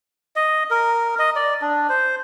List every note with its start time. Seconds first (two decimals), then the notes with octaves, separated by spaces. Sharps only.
0.36 D#5
0.71 A#4
1.19 D#5
1.36 D5
1.62 D4
1.89 C5